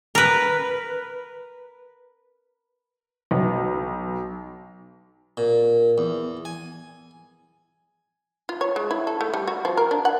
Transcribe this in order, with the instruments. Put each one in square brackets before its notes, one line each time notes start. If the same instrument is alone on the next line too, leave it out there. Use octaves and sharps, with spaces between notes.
[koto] A#4 B4
[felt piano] B1
[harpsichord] A#2
E2
G#5
[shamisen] F4
C#5
G#3
E4
A4
A3
G3
F#4
F3
A#4
D4
F#5